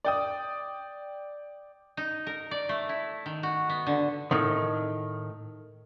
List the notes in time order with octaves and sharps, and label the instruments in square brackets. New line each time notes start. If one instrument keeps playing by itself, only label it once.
[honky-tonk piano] D5 G5 D#6
[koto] D#4
A#4
D5
A3
E4
D#3
F#4
B3
D3
[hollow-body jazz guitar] A2 D#3